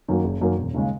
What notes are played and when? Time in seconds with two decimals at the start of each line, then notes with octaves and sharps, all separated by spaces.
0.08 F#2 D#3 F#3 A#3
0.24 F#1
0.41 F#2 D#3 F#3 A#3
0.58 E1
0.74 D#2 C#3 G#3